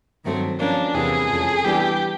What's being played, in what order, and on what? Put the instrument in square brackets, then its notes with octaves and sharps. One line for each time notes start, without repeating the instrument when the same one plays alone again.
[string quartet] G2 D#3 F#3 A3 C4
[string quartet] F3 A#3 C#4 [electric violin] D4
[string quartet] E2 C3 E3 G3 A#3 [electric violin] G#4
[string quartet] F2 C#3 F3 A3
[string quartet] E3 G3 B3 D4 [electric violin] G4